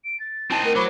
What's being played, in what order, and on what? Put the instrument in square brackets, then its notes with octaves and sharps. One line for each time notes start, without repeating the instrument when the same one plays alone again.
[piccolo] D7
A6
[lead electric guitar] C4 D#4 [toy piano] E4 A5
[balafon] A3 A#4
[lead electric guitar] F#3 [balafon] C5 B5 C#6 [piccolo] D6